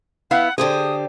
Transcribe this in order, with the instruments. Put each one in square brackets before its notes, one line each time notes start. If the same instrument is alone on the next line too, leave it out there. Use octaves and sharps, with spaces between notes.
[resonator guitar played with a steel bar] B3 E4 F5 [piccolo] F#5
[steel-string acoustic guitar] D3 G4 C5 [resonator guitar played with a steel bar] G#4 [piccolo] D#6